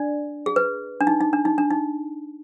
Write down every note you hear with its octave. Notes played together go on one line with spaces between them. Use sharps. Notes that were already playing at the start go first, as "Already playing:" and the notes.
Already playing: D4 D5
G#4
B4
D4
D#4
D#4
D4
D#4
D4
D#4